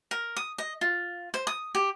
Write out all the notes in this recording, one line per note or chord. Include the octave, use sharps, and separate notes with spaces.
A#4
D#6
D#5
F4
C5
D#6
G4